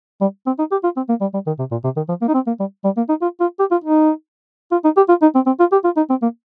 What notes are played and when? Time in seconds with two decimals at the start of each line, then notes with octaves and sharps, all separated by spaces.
0.21 G3
0.46 C4
0.59 D#4
0.71 G4
0.84 F4
0.96 C4
1.09 A#3
1.21 G3
1.34 G3
1.47 D#3
1.59 C3
1.71 A#2
1.84 C3
1.96 D#3
2.09 F3
2.22 A#3
2.28 D#4
2.34 C4
2.47 A#3
2.60 G3
2.84 G3
2.97 A#3
3.09 D#4
3.22 F4
3.40 F4
3.59 G4
3.71 F4
3.84 D#4
4.72 F4
4.84 D#4
4.97 G4
5.09 F4
5.22 D#4
5.35 C4
5.46 C4
5.60 F4
5.72 G4
5.84 F4
5.97 D#4
6.10 C4
6.22 A#3